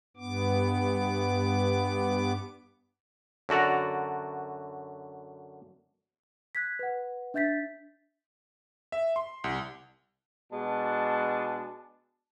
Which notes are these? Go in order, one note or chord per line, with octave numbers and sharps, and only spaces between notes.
G2 B3 D6
F#2 D3 F#4 D5 A#5
F#6 G#6 B6
B4 F#5
D4 E5 G6 A6 B6
E5
C6
C2
B2 G#3 D4 A5